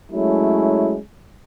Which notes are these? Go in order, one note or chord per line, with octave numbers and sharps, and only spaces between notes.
F#3 G#3 A3 C#4 E4